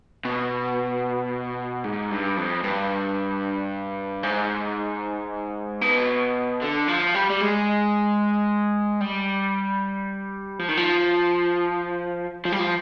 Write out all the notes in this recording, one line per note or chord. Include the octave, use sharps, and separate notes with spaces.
B2
G#2
G2
F2
G2
G#2
B2
D3
F3
G3
G3
G#3
G3
F3
D#3
F3
F3
G3
F3